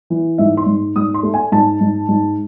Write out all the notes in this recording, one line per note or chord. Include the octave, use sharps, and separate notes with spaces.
E3
G#2 E5
C6
G#2
G#2 D#6
C6
A3
G#5
G#2 A5
G#2
G#2